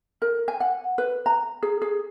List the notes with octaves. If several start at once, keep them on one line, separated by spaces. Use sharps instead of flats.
A#4
G#5
F#5
B4
A#5
G#4
G#4